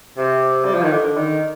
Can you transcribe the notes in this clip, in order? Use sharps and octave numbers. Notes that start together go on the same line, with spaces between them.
C3
G3
F3
D#3
D3
D#3